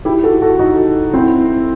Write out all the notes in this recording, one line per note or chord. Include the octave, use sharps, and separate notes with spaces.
E4 G4
F#4 A4
F#4 A4
D#4 F#4
C4 E4